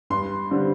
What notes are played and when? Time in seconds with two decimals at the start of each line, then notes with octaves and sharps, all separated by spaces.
0.10 G2 C6
0.51 D3 G3 C4